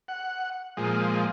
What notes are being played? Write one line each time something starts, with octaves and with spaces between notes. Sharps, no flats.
F#5
A#2 F3 G#3